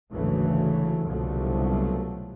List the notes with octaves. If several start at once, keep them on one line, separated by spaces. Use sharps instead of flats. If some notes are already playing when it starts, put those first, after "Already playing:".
G#1 D2 C#3 E3 F#3 A3
C2 B2 D3 F3 F#3 A3